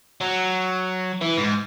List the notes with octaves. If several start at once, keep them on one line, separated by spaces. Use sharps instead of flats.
F#3
E3
G#2